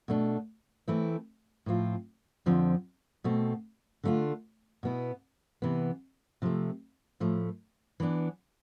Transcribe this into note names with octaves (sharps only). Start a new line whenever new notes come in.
B2 A3 D4
E3 A3 C4 E4
A2 F3 C4 F4
F2 D3 F3 C4
B2 A3 C4
D3 A3 D4 F4
B2 B3 E4
C3 E3 B3
C3 F3 A3
A2 F3 A3
E3 B3 D4